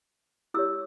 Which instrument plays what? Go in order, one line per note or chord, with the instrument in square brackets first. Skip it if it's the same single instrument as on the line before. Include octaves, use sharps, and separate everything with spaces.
[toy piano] E4 G4 C#5 E6